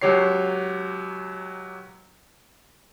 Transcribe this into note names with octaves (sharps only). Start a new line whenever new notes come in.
C#2 F#3 G4 C#5 C7